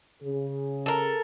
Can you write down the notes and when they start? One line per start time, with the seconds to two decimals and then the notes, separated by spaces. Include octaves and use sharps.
0.23 C#3 G#4
0.86 A4 A#4